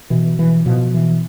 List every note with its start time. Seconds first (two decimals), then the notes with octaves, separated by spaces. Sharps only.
0.10 B2 E3
0.39 E3
0.66 B2 F3
0.94 E3